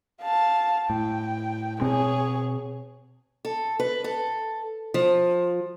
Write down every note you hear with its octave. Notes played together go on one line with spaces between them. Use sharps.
F5 A5
A2 G5
B2 C4 G#4 C#5
A4
B4
A4
F3